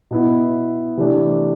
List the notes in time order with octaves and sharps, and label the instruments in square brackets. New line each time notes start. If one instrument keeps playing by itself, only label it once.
[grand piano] B2 B3 E4
C3 E3 A3 D4